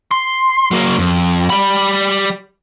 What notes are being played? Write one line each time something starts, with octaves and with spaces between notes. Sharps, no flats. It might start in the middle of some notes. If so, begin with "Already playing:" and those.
C6
F#3 A#3
F2
G3 B5